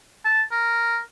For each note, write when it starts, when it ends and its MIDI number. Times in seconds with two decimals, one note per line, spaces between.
0.25 0.42 81
0.51 0.98 70